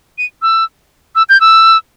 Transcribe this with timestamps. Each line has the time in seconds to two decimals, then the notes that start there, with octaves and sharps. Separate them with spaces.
0.18 D#7
0.42 E6
1.15 E6
1.29 G6
1.40 E6